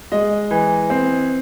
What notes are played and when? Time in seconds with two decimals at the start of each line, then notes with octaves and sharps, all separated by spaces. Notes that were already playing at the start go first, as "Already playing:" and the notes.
0.12 G#3 D#5
0.51 E3
0.90 C4